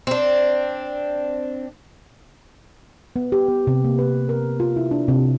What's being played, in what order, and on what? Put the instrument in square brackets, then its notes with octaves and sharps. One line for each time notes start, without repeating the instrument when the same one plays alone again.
[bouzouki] C4 D4
[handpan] B3
G4
B3
C3
A#3
B4
A#4
F4
E4
D4
C3